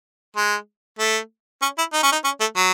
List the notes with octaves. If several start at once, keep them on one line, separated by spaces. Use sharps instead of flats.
G#3
A3
C#4
E4
D#4
C#4
D#4
C#4
A3
F#3